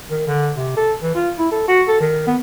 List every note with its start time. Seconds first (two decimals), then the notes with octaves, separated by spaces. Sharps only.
0.10 D#3
0.28 D3
0.57 C3
0.76 A4
1.02 E3
1.15 F4
1.38 E4
1.51 A4
1.68 F#4
1.88 A4
2.00 D#3
2.27 B3